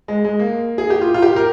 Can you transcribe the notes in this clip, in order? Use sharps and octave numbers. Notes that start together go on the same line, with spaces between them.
G#3
G#3
A#3
G#4
G4
F4
F4
G4
A#4